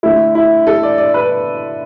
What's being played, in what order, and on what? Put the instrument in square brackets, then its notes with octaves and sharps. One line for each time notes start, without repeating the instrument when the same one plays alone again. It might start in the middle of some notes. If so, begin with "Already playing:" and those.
[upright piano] D3 A3 E4
E4
A4
D5
D5
B4